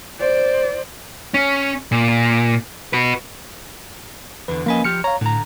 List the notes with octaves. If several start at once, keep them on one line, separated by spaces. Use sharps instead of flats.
C5 D5
C#4
A#2
F#4 B4
E2 D3 B4
F3 A#3 C#4 B4 D#5 G#5
F3 G4 F6 C#7
C#5 F5 A#5
A2 D3 A#5